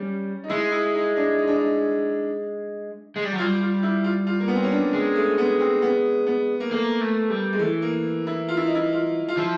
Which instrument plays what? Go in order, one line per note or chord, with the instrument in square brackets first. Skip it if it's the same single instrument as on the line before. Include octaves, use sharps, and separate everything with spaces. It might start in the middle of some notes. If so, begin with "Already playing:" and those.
Already playing: [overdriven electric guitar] G3 [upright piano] C#4
[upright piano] D#4
[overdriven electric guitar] G#3 [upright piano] E4
[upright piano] E4
D#4
D4
D#4
D4
D#4
[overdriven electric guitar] G#3
G3
F#3
[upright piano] F4
[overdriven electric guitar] G3
[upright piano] F4
E4
F4
F4
A#3
B3
C4
C#4
D4
[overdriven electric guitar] G#3
[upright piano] A3
B3
C4
B3
B3
A#3
[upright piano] A3 [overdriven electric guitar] A#3
[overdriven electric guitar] A3
G3
[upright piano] G#3
[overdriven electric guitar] E3 [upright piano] A3
[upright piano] A#3
E4
F4
E4
D#4
E4
F4
F4
[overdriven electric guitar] F3 [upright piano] E4